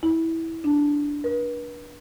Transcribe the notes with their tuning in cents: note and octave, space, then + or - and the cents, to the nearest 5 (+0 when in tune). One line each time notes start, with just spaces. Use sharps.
E4 -15
D4 -10
B4 -40